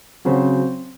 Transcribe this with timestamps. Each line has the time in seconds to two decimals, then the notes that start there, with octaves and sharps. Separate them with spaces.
0.25 C#3 F#3 C4 F#4 C5